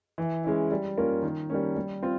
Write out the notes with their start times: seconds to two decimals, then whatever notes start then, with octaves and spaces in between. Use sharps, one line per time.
0.18 E3
0.44 G#3 C#4 E4
0.71 G3
0.97 A#3 C#4 F4 A#4
1.23 D#3
1.50 G3 A#3 C#4
1.76 G3
2.03 C4 F4